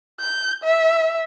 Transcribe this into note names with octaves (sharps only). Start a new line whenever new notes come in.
G6
E5